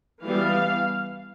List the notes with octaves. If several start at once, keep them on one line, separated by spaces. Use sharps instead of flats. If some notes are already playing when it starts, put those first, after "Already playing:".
E3 G3 B3 F5